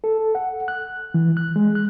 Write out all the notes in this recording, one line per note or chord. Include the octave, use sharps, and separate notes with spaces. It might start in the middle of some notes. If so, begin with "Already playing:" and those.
A4
F#5
F#6
E3
F#6
G#3
F#6